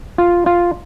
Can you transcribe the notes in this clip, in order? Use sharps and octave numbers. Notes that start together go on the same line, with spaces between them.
F4
F4